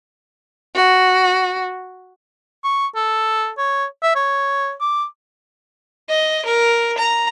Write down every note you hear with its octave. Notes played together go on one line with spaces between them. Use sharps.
F#4
C#6
A4
C#5
E5
C#5
D6
D#5
A#4
A#5